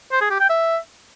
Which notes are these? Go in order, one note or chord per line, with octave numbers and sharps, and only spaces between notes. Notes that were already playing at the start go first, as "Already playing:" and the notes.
C5
G#4
G4
G5
E5